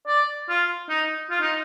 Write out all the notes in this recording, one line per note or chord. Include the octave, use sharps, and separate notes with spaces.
D5
F4
D#4
F4
D#4